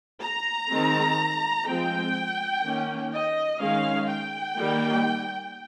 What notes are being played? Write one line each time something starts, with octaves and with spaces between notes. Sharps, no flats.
A#5
D#3 G#3 C4
F3 G#3 C4 G5
D#3 A#3 C#4
D#5
D#3 G#3 C#4 F5
G5
D#3 G3 A#3